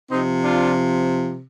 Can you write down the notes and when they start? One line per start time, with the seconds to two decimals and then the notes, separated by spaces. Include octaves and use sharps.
0.10 C3 F3 C4 D#4
0.42 D4 F4